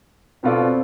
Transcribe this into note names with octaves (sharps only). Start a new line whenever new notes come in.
B2 B3 C4 F4 A4 D5
C4